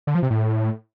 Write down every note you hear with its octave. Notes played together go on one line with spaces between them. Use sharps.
D3
F3
C3
A2